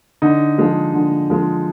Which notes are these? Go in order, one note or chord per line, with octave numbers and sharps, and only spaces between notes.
D3 D#4
F3 G#3
D3
F3 G#3